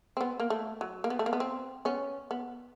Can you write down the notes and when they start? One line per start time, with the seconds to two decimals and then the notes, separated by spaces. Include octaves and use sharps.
0.17 C4
0.21 B3
0.40 A#3
0.50 A3
0.81 F#3
1.04 A#3
1.10 B3
1.19 A3
1.26 A#3
1.33 B3
1.40 C4
1.85 B3 C#4
2.31 B3